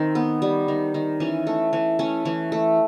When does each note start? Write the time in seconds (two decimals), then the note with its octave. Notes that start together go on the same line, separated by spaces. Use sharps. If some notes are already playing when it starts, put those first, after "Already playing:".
Already playing: D#3 C4
0.15 B3
0.42 G3
0.68 D#3
0.94 D#3
1.20 E3 C#4
1.47 A3
1.73 E3
1.99 A3 C#4
2.25 E3
2.52 A3